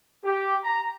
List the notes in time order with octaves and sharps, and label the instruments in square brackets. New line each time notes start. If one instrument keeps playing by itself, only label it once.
[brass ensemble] G4
A#5